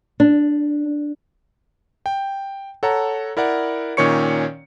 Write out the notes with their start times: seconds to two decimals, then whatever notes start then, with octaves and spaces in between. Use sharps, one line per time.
0.20 D4
2.06 G5
2.83 A4 C#5 F#5 A5 A#5
3.37 E4 A#4 D5 F#5
3.97 A#2 D#3 C#4 C#5 C#6 C#7